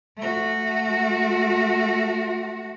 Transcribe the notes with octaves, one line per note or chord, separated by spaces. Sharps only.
A3 F#4